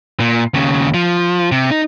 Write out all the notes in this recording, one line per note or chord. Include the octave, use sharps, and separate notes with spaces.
A#2
D#2 C#3
F3
C3
D#4